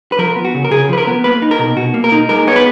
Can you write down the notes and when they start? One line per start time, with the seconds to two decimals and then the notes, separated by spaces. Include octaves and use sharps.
0.12 B4
0.18 F3 A#4
0.36 B3
0.45 F#4
0.54 C#3
0.65 A#4
0.71 C#3 G#4
0.89 F3 B4
0.98 A#4
1.07 B3
1.24 A#3 B4
1.42 D#4
1.51 A#4
1.59 B2
1.77 B2 F#4
1.94 A#3
2.04 A#4
2.12 D#4
2.29 G#3 A#4
2.47 B3 C#5
2.56 B4